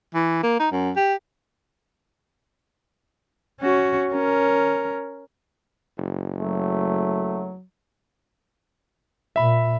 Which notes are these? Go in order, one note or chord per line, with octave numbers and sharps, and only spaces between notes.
E3
A#3
D#4
F#2
G4
C#4 F#4
C#4 A#4
F#1
F#3 A3
A#2 E5 B5